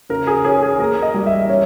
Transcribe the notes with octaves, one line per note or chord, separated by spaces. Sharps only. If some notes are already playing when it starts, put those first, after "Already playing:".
C#3 A#4
G#4
C#4 G#4
G#4
A#3 A#4
D#5
G3
E5
C#4 C#5